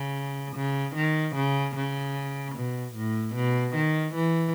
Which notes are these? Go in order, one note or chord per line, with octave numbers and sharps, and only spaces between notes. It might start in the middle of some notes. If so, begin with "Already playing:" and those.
Already playing: C#3
C#3
D#3
C#3
C#3
B2
A2
B2
D#3
E3